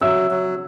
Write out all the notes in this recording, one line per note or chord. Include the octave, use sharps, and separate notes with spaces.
F#3 E5 E6
F#3